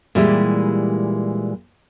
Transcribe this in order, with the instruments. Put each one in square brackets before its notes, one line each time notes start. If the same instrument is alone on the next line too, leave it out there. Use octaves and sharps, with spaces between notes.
[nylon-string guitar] A#2 E3 G3 G#3 E4 G4